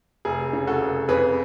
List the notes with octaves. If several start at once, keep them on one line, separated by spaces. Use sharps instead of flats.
F1 G#4
C#3
F#4 A4
F1
F2 G#4 B4